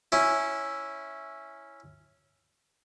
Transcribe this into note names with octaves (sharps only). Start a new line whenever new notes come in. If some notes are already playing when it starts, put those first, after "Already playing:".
C#4 E4